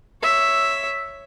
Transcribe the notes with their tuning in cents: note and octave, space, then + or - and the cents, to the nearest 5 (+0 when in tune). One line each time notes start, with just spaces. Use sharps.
C#5 +0 E5 +0